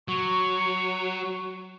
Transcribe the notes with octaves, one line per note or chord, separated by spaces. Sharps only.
F#3 C#6